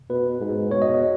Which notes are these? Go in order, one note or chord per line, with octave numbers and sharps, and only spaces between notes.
B2 B4
G#2
B2 C#5
D#5